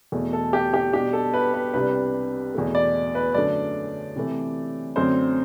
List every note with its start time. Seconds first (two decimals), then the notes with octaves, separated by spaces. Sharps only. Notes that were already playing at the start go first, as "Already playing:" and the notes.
0.12 E2 B2 A3
0.33 A4
0.53 G4
0.74 G4
0.93 B2 G3 D4 G4
1.13 A4
1.34 B4
1.54 B4
1.73 C2 C3 G3 D4 B4
2.54 E2 B2 A3
2.75 D5
3.15 B4
3.34 F#2 D3 A3 D4 D5
4.16 C3 E3 A3
4.96 F#2 D3 A3 C4 C5